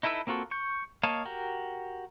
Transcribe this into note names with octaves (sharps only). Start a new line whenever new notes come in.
D#4 E4 A4 B4 E6
A#3 C4 F4 F#4 A4
C#6 G6
A#3 C#5 D#5 F5 A5
F#4 G4 A#4